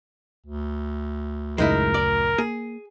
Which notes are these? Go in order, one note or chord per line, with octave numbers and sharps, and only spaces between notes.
D2
A#1 F#2 C#3 G#3 D#4 E4 A#4
D5
A#3 G#4